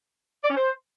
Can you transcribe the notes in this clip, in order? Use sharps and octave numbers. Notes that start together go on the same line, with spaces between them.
D5
C#4
C5